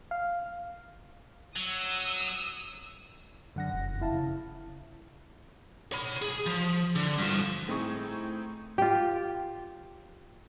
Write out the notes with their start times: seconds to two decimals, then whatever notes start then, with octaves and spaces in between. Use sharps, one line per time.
0.11 F5
1.56 F#3 D#6 E6
3.56 F#2 D3 F#5 A#6
3.74 F1
4.01 E4 F5 A5
4.13 C#3
5.92 C#5 B5
6.22 G#4
6.46 F3
6.96 D3
7.18 G2 F3
7.68 A2 C4 D#4 G#4 C#6
8.78 F4 G4